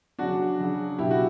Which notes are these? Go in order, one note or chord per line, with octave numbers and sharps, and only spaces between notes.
C#3 F#3 D4 F#4
C#3 F#3
B2 F#3 E4 G4
F#4